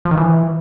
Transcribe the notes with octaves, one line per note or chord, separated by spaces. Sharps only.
F3
D#3
E3